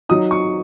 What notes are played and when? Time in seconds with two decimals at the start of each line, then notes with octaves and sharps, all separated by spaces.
0.09 F#3 D#4 D#6
0.31 C#6